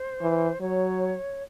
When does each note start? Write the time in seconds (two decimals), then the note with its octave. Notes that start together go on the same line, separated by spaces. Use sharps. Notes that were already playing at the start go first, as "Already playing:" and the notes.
Already playing: C5
0.22 E3
0.61 F#3 C#5